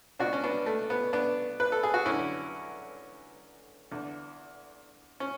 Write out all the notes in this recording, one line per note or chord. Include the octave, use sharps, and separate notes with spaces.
C#2 B2 D4 F#4
C#4
B3 D4
A3
B3
B3 D4
B4
A4
G#4
F#4
F#2 D3 C#4 E4
E2 D3
C#4